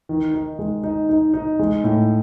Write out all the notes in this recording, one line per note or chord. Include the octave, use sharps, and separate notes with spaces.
D#3
D#4
G#3
D#4
D#4
D#4
G#3
A2